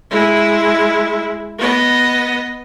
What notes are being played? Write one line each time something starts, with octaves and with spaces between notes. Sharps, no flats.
G#3 E4
B3 D#5